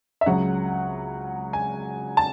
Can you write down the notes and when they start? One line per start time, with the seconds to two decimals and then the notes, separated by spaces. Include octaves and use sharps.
0.21 E5
0.26 C#2 C#3 F#3 F#5
1.53 G#5
2.17 A5